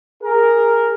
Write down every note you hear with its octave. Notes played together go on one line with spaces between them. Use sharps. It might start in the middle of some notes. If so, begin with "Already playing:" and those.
G#4 A#4